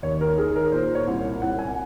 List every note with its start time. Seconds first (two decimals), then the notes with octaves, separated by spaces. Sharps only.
0.02 D#2 C#5
0.21 A#4
0.38 D#3 G#4
0.56 A#4
0.72 A#2 C5
0.95 C#5
1.07 C2
1.42 C2 F#5
1.59 G#5